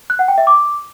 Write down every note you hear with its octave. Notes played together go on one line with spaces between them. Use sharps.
F#6
F#5
G5
E5
D6